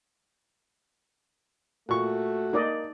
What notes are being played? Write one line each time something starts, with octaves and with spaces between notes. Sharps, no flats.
A#2 A3 F#4 C#6
A#3 D#4 D5 D#5